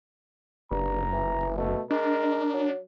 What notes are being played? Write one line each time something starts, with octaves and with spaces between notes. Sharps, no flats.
F#1 G2 A#5
E3
B2 A3
G#3 D4 A#4
F#3